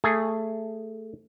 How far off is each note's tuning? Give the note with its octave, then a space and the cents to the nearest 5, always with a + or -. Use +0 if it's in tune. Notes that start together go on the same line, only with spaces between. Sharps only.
A3 +10 G#4 +0